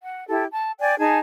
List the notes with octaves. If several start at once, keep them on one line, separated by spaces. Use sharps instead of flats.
F#5
E4 G4 A4
A5
D5 G5 G#5
D#4 G#4 G#5 A5